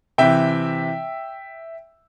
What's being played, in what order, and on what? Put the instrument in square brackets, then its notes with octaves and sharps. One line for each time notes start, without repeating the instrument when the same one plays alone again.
[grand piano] C3 E3 E5 G5